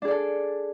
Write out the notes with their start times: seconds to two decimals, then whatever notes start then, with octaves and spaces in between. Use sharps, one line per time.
0.02 D4
0.05 G#4
0.08 D5
0.11 A4